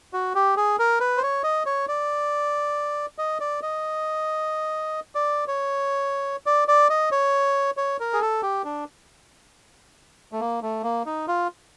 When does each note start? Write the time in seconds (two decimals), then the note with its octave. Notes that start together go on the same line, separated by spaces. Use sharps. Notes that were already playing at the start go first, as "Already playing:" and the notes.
0.13 F#4
0.35 G4
0.57 G#4
0.79 A#4
1.00 B4
1.17 C5
1.23 C#5
1.44 D#5
1.66 C#5
1.88 D5
3.18 D#5
3.40 D5
3.63 D#5
5.15 D5
5.48 C#5
6.46 D5
6.68 D5
6.90 D#5
7.12 C#5
7.77 C#5
8.00 A#4
8.13 G#4
8.22 A4
8.43 G4
8.65 D4
10.32 A3
10.40 A#3
10.62 A3
10.83 A#3
11.06 D#4
11.28 F4